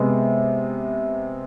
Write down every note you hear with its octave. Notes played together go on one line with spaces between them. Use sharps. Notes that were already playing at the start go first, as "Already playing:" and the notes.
Already playing: C3 G#3 B3